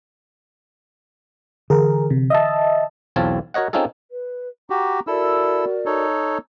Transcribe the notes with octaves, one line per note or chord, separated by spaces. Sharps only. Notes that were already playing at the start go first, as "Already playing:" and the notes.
D3 E3 G#4 A#4
C3
D#5 E5 A5
B1 E2 C4 F4 C#5 A5
F#4 A#4 C#5 D#5 F#5
C4 C#4 D#4 F4 G#4 A4
B4
F#4 G4 A#5
E4 F#4 A4 A#4 D5 E6
D#4 A4 C#5